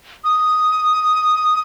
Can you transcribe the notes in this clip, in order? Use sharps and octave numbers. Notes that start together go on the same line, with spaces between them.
D#6